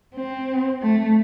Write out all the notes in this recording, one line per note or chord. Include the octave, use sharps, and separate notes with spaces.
C4
A3